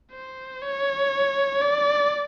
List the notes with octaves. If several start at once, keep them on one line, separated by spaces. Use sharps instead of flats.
C5
C#5
D5